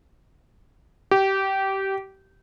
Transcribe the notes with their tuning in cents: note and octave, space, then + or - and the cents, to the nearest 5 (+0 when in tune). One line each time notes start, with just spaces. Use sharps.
G4 -20